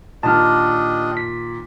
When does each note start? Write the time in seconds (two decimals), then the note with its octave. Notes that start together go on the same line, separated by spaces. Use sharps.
0.23 A#2 D#3 D4 G4 D#5 A5 F6
1.17 B6